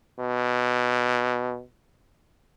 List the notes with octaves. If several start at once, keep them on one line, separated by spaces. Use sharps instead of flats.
B2